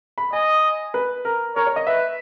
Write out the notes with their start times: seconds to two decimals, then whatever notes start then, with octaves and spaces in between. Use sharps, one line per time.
0.18 B5
0.32 D#5 G#5
0.94 B4
1.25 A#4
1.56 A#4 C#5
1.66 C#5
1.76 D#5
1.87 B4 E5